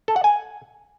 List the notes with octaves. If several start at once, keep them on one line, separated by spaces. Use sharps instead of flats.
A4
F#5
G#5